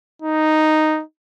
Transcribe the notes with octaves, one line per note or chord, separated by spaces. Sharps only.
D#4